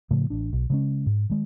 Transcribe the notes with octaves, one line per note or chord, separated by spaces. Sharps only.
A2 C#3 F3 A3
A1 D4
B1
C#3 G#3 C#4
G#2
D#3 G#3